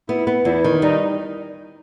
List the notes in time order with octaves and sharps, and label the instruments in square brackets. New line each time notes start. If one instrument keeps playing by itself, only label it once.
[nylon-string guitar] B3 [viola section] E4
[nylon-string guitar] B3
[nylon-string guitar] E2 [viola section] E4
[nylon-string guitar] D#3
[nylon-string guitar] G3 [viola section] D#4